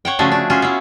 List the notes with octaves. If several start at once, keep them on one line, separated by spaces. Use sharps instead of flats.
C#5 F#5 G5
C#3 F3 A3 D4 F#4 G#4
D4
C#4 F4 F#4 G#4
B3 E4